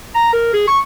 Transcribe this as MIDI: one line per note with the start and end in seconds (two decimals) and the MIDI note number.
0.15 0.31 82
0.33 0.53 70
0.53 0.65 68
0.67 0.78 85